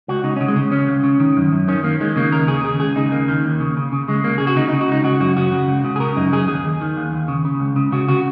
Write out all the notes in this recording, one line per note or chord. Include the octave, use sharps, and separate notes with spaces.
C#2 F#4
C#3 D#4
C#4
C#3
G#3
C#3
C#3 C#4
C#2
C#3
D#3
F#2
F#2
D#3 C#4
D#3 A#3
D#3 G#3
C#3 A#3
D#2 A#4
C#3 G#4
C#3 G#4
C#2 G#4
C#3 D#4
D#2 A#3
D#3
D#2
C#3
C#3
C#3
C#3 G#3
C#2 A#3
C#3 G#4
F#4
C#3 D#4
D#4
C#3
F#4
C#2 D#4
C#3 F#4
F#2 F#4
C#3 F#4
C#3
C#2
C#3
G#4
C#3 A#4
F#2 D#4
F#2 G#4
D#2 G#4
D#2
D#3
D#2
D#2
C#3
C#3
C#2
C#3
C#3 F#4
C#3 F#4